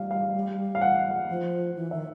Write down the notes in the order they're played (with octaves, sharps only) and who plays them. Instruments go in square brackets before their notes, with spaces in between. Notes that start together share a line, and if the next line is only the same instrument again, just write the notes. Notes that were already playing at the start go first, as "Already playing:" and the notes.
Already playing: [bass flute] G3 [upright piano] F5
[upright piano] F5
F5
F#5
[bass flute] F3
E3
[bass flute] D#3 [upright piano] E5